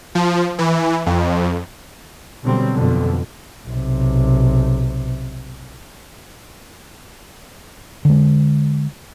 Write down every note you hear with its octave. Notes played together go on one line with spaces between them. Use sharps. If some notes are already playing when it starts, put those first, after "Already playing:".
F3
E3
F2
B2 D3 F#3 G3 C4
F2 B2 D3
B1 C3
D3 G#3